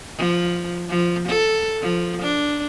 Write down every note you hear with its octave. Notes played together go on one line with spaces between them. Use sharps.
F3
F3
A4
F3
D4